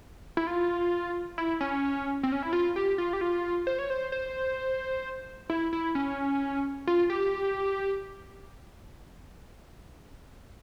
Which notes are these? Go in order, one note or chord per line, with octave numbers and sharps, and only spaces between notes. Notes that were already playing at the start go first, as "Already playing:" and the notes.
E4
F4
E4
C#4
C4
C#4
E4
F4
G4
F4
G4
F4
C5
C#5
C5
C5
E4
E4
C#4
F4
G4